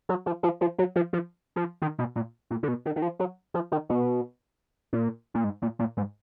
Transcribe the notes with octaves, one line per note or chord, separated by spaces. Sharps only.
F#3
F3
F3
F3
F#3
F3
F3
F3
D#3
B2
A#2
A#2
D3
B2
D#3
D#3
F3
F#3
F3
D#3
B2
A#2
A#2
G#2
A#2
A#2
G#2